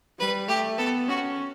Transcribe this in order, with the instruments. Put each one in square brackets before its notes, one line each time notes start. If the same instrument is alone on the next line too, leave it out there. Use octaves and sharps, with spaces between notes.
[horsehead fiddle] G3 [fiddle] B4
[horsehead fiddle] A3 [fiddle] G4
[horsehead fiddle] B3 [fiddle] A4
[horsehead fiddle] C#4 [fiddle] F#4